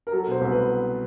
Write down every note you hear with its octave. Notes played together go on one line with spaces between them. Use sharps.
A#4
F#3 A4
B2 C5
C2
B4